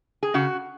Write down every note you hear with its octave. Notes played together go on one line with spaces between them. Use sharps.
G#4
C#3 F#4